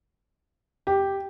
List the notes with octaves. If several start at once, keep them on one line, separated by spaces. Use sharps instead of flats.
G4